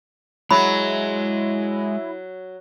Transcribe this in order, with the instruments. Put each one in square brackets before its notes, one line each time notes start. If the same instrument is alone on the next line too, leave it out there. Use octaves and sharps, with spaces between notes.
[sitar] F#3 [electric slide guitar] G#3 G#4 [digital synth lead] E4 [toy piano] B5